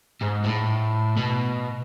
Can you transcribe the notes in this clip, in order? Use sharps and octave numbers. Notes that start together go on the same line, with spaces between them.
G#2
A2
B2